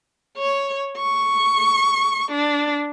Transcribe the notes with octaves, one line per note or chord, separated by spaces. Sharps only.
C#5
C#6
D4